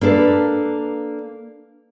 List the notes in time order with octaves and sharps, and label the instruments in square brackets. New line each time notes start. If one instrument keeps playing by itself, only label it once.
[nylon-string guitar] A#3 D4 A4 B4